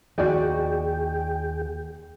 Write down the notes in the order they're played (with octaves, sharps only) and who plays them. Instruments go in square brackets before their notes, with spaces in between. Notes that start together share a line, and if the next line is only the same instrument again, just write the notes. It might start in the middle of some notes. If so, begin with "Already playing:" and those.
[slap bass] D#2 F3 [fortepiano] F#4 D5 D#5 [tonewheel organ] G#4 G5